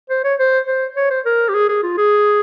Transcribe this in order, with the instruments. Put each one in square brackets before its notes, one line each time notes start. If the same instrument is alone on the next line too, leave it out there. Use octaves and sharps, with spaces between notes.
[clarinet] C5
C#5
C5
C5
C#5
C5
A#4
G4
G#4
G#4
F4
G#4